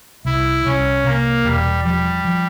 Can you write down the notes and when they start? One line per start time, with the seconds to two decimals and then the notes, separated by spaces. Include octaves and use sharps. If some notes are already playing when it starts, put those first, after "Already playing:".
0.25 C2 E4
0.65 C2 C#4
1.04 C3 A#3
1.45 E1 G3
1.84 F3 G3
2.25 F3